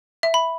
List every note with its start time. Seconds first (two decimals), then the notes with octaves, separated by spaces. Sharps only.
0.23 E5
0.34 B5